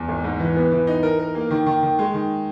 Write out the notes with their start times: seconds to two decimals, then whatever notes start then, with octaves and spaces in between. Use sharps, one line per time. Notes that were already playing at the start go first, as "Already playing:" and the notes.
Already playing: E2
0.08 G#1
0.24 G#2
0.40 E3
0.56 B3
0.72 E3
0.87 D#4
1.03 A#4
1.19 A#4
1.35 A#3
1.50 D#3
1.66 D#3
1.83 D#3
1.99 G#3
2.14 D#3